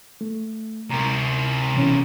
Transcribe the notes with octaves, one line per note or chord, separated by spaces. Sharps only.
A3
C3 A#4 A#5
B2 E3 C#4